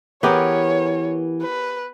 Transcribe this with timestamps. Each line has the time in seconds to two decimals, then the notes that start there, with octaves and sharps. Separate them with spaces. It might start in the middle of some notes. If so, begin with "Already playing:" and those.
0.23 E3 B3 G4 G#4 A#4 C#5
1.42 B4